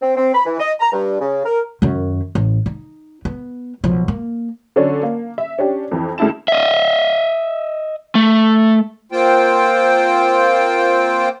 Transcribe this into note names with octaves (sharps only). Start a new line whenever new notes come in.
C4
C4
B5
E3
D#5
A#5
G2
C#3
A#4
F#2 D#3
A1
D#4
B3
B1 F3
A#3
D3 F#3 C#4 D4
A#3
E5
C#4 D4 G4
F2 E3
D2 G#3 E4 A5 E7
D#5 E5
A3
A#3 C4 F4 C5 G5